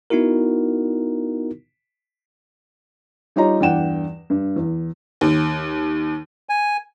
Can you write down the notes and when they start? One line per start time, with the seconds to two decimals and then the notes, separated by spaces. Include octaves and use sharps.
0.10 B3 D#4 E4 F#4 A#4
3.36 G3 D#4 F4 C#5 D#5 A#5
3.61 E2 G2 D5 F#5 G5 E7
4.30 G2
4.56 E2
5.21 D#2
6.49 G#5